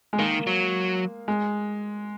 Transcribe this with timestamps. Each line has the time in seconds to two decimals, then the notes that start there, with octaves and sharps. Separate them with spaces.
0.13 G#3
0.19 D#3 A#3
0.47 F#3
1.28 G#3